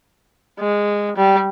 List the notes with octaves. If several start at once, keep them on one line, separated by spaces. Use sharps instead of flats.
G#3
G3